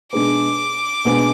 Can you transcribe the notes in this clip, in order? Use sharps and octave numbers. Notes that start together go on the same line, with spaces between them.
B2 G#3 D4 G#4 B4 D6
B2 G#3 D4 G#4 B4